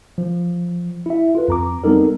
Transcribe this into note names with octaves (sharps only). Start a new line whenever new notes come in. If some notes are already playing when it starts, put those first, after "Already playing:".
F3
E4 E5
F4 A4 B4
F2 A#5 D6
G3 B3 C4 D#4 A4 A#4